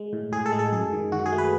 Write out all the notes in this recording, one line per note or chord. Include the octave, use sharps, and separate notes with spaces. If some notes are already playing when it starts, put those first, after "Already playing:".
Already playing: G#3
A2
A2 G#4
A4
G#3
A4
F#2 G#4
D#3
D#3 F#4
G#4
A3
B4